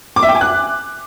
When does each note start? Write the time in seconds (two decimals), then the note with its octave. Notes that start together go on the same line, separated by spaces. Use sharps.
0.16 D6
0.23 E5
0.29 G5
0.35 G#5
0.41 F#6